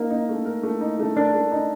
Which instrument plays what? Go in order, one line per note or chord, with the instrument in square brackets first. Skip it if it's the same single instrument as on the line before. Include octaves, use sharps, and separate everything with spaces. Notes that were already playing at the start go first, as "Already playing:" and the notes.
Already playing: [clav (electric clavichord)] A#3 [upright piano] D#4 A#4
[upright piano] D#4
A3
A#4
A3
D#4
A3
[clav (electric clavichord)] D4 [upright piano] A#4
[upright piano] A3
D#4